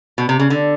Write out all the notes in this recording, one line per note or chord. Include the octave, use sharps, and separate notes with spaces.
B2
C3
C#3
D3